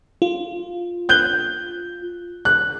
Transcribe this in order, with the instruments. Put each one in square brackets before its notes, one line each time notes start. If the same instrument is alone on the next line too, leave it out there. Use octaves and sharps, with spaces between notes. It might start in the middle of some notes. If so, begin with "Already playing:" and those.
[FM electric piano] F4
[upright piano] F#6 G6 G7
F#6